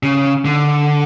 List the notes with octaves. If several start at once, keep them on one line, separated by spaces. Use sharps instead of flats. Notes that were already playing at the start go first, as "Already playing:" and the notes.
C#3
D3